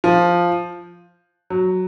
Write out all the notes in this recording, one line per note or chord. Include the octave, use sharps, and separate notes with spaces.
F3
F#3